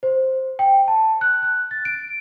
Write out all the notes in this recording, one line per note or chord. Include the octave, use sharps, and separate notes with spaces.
C5
G5
A5
F#6
F#6
A6
D7